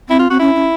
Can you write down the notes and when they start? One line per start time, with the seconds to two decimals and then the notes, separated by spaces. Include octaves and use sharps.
0.09 C4 E4
0.19 F4
0.30 C4 F#4
0.40 C#4 E4
0.55 C#4